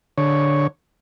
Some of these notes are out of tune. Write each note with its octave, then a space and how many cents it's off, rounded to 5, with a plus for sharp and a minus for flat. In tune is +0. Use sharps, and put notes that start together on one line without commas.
D3 +0 C#5 +0